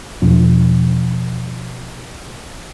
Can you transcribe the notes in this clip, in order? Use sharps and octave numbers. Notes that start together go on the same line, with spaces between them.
E1 E2 F3 D4